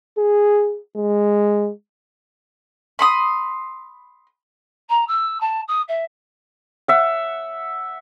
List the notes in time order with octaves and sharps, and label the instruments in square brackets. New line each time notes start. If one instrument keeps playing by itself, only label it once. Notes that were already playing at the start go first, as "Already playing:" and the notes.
[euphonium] G#4
G#3
[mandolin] B5 C6 D#6
[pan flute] A#5
E6
A5
D#6
E5
[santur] E5 F#5